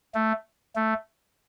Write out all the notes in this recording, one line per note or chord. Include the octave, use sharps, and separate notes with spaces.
A3
A3